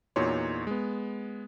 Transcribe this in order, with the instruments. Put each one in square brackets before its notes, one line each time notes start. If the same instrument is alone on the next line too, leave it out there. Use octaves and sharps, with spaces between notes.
[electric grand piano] E2 A#2 D#4 F#4 C#5 C6
G#3 B3